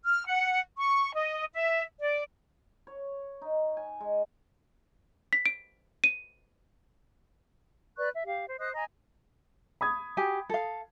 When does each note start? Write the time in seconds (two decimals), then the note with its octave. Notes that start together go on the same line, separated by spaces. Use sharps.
0.05 F6
0.27 F#5
0.77 C#6
1.14 D#5
1.54 E5
2.00 D5
2.87 C#5
3.41 D#4
3.77 G#5
4.00 G#3
5.33 B6
5.46 D7
6.04 D#7
7.97 B4 D5 C#6 F#6
8.13 E5
8.25 G4 F5
8.46 C5
8.59 C5 D#5 D#6 F#6
8.73 D#5 G#5 A#5
9.81 B5 D#6 G#6
10.17 F#4 G4 G#5
10.50 A4 F5